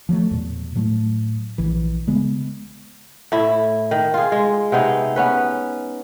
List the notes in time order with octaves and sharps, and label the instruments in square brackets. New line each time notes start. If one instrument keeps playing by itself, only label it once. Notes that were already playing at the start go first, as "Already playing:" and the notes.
[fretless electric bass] F3 F#3 G#3 A3
E2 A#2
A2 F#3 A3
A#1 E3
C#3 G#3 B3
[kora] A2 E4
D#3
F4 G#4
G#3
C3 B3 D#4 G#4
B3 C#4 B4